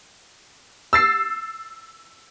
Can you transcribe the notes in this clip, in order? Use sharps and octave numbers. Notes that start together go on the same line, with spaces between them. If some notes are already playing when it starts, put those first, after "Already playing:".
E6 A6 C7